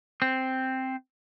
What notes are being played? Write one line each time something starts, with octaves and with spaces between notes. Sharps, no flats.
C4